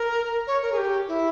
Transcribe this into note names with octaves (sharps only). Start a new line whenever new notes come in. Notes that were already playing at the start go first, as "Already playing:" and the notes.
Already playing: A#4
C#5
A#4
G#4
G4
E4